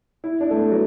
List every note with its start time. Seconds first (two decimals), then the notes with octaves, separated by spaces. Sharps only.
0.24 E4
0.41 D4
0.51 A3
0.56 B3
0.72 F#3